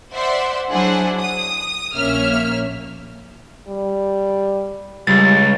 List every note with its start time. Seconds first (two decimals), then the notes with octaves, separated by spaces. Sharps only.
0.12 C5 D5 E5 F#5 C6
0.71 F#3 D4 E4 G#4 C5 F#5
1.20 D#6
1.94 A#1 A#3 C#4 E5 F6
3.68 G3
5.07 C#2 G3 A6